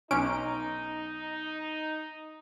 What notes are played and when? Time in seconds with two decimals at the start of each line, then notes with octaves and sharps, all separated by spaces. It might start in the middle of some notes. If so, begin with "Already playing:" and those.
0.11 B1 C#4 D#4 D7